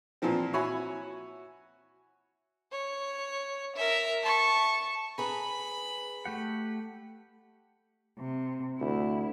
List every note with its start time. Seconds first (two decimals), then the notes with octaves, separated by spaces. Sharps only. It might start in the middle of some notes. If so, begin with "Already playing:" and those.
0.22 A#2 E3 F3 C4
0.53 E4 F#4 C#5 G#5 B5
2.72 C#5
3.76 A#4 E5
4.23 A5 C#6
5.18 G#4 B4 A#5 B5
6.25 A3 G4 F#5
8.20 C3
8.80 D2 E4